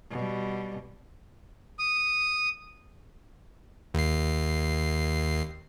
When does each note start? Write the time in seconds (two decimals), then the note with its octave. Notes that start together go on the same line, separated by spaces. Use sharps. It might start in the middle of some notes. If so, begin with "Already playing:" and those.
0.11 B2 G3
1.79 D#6
3.94 D#2 C7